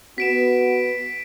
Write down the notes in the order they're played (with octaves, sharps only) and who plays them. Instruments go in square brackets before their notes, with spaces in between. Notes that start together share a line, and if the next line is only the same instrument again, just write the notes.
[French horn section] B3 F#4 [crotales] B6 D7 E7